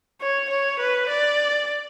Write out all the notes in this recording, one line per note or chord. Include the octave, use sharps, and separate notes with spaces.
C#5
C#5
B4
D5